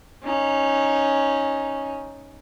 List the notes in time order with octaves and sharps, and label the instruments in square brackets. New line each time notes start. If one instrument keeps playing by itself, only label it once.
[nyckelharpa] C#4 D#4